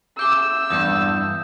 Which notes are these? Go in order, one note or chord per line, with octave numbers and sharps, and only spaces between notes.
E4 G#4 D6 E6 G6 G7
E2 G2 A4 D#6 G6